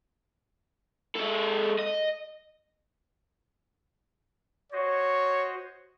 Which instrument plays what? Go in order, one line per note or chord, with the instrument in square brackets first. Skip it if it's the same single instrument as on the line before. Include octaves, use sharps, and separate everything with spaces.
[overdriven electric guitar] G#3 A4
D#5
[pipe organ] F#4 C5 D#5 [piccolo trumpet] C#5